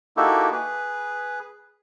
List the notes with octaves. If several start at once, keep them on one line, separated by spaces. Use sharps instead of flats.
A#3 D#4 E4 F#4 G4 A4
G#4 B4